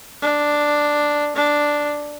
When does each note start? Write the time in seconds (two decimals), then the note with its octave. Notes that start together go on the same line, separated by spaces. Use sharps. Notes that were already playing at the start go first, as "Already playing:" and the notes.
0.22 D4
1.36 D4